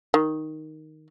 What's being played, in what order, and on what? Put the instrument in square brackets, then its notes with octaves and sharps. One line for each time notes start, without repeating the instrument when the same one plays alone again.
[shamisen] D#3